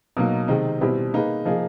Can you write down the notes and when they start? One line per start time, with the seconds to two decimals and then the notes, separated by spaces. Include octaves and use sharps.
0.17 B2 F#3 A#3 D#4
0.48 C3 D#3 G#3 C4 D#4
0.81 B2 G3 C4 E4 G4
1.14 A#3 D#4 G#4 B4
1.45 F3 A#3 D#4 G#4